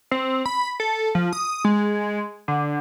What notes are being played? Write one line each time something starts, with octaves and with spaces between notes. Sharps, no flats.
C4
B5
A4
F3
D#6
G#3
D3